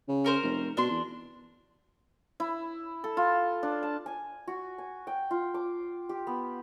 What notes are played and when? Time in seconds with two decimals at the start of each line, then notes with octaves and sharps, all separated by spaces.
0.08 C#3
0.24 C#4 A#4 C5
0.43 F1
0.77 B2 D4 C6
0.91 E2
2.40 E4
3.04 A4
3.17 F4
3.63 D4
3.83 A5
4.06 G#5
4.47 F#4
4.78 G#5
5.07 G5
5.31 F4
5.54 D6
6.09 G4
6.27 B3